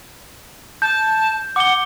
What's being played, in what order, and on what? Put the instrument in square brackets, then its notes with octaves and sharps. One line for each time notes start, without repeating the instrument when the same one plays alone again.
[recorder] A5 [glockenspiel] G6
[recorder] F#5 [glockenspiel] D6 G7